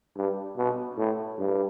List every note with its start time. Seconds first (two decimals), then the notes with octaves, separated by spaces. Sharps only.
0.17 G2
0.56 B2
0.97 A2
1.38 G2